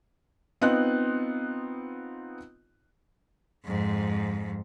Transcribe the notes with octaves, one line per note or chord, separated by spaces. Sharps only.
B3 C4 D#4 F4 F#6
F2 G#2